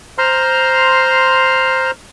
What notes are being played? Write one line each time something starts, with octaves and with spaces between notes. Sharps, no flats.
C5 A#5 C6 F6